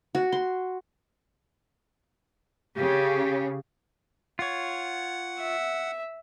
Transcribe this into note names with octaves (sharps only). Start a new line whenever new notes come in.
F#4
C6
C#3 G4
F4 C#5 F#5
E5